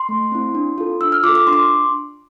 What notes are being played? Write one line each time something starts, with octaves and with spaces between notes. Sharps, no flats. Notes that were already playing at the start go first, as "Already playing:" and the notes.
Already playing: C6
A3
C4 E4
D4
F4 A4
D4 E6
F6
F4 A4 D6
D6
D4 C6
D6